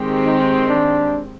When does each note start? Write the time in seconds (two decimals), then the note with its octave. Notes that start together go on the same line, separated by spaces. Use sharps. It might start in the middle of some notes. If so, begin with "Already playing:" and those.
Already playing: D#3 G#3 C4 G4
0.25 D#4
0.69 D4